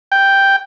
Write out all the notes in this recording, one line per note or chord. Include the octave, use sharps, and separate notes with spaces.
G5